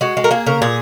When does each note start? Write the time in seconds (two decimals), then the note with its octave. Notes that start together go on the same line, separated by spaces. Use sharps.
0.01 G#3 F#4
0.17 G#3
0.24 A#4
0.31 A#3 G#4
0.47 C#3 A#4
0.62 A#2 G#4